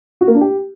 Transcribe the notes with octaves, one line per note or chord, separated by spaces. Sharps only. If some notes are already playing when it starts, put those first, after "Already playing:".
F#4
A#3
D4
G4